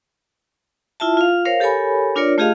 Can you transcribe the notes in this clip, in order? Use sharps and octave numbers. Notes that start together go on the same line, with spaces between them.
E4 F4 E5 A5
F4 F5
A#4 C5 C#5 F5
G4 A4 A#4 C#5 G#5 B5
D4 F4 A#4 C#5 D5
A3 F4 G4 G#4 D#5 F5